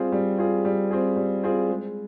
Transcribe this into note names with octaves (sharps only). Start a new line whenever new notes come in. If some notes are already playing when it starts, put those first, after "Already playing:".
Already playing: G3 C4 F4 G#4
G3
C4 F4 G#4
G3
C4 F4 G#4
G3
C4 F4 G#4
G#3